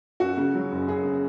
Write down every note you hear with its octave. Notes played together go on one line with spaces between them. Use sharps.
F#2 F#4
C#3
F#3
F#1
F#2 G#4
C#3